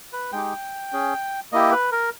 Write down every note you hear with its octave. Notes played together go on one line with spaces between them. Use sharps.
B4
G#3 D#4 G4 G5
C#4 G#4
A#3 E4 G4 D#5
B4
A#4